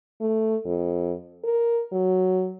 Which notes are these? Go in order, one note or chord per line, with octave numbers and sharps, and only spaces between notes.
A3
F2
A#4
F#3